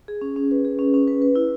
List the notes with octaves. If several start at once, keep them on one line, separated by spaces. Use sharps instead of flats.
G#4
C#4
C#4
B4
G#4
C#4
C#4
B4
B4
E4